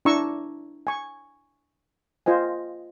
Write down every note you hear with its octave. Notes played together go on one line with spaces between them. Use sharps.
D4 E4 A#5 C#6 E6
G#5 C#6
F4 C5 D#5 G#5